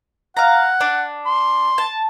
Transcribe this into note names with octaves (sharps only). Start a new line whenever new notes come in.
F5 F#5 A#5
D4
C6
A5